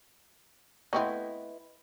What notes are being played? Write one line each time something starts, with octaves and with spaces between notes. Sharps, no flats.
A3 B3 C4 E4 B4 D#5